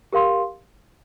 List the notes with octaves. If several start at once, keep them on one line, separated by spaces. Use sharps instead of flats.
G4 A#4 F5 C6